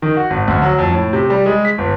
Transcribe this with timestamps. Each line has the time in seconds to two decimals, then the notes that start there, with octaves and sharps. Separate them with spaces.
0.02 D#3
0.17 F#4
0.30 G#1
0.48 D2
0.62 F#3
0.79 F2
0.91 A2
1.13 C3
1.30 G3
1.46 G#3
1.65 B6
1.78 G1